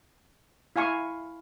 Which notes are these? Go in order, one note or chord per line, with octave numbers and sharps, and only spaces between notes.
E4 F5 G#5 C#6